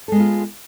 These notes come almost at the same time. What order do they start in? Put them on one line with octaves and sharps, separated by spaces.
A4 G#3 B3 F4